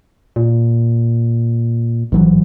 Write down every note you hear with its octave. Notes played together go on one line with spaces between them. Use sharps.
A#2
A1 G#2 E3 F#3